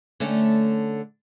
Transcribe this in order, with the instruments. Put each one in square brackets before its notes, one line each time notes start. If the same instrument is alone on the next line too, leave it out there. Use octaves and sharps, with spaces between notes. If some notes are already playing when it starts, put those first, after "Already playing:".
[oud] D3 A3 C#4